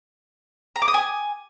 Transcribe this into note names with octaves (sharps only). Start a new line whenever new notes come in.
A#5
D6
D#6
G#5